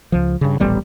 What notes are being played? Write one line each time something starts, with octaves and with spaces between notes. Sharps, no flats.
C#2 F3
G2 C#3
D#1 A1 G3 B3